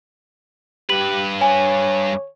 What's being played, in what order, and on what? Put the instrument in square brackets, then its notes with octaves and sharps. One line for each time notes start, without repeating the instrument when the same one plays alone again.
[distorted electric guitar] G2 B4 [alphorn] G4 [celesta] F#7
[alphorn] C#5 [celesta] G#5